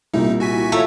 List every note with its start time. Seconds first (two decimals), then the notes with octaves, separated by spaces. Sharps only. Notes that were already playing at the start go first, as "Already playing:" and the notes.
0.14 C2 A#2 D#4 E4
0.40 F#4 G#5 B6
0.72 A3 F4 C#5 A5 A#5 E6